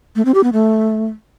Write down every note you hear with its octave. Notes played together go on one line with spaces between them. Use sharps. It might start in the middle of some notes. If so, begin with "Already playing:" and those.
A3
C4
G4
B3
A3